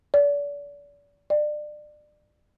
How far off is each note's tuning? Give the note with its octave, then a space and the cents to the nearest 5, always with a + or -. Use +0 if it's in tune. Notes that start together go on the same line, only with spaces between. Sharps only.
D5 -35
D5 +30